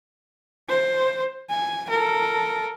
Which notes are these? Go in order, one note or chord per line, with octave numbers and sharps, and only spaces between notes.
C5
G#5
A4 A#4